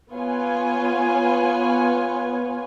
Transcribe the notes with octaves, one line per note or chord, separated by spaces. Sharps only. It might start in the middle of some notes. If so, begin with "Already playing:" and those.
B3 F4 B4 C#5 G#5